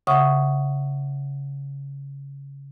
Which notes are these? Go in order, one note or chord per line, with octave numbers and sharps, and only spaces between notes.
C#3 E5 F#5 C#6 D#6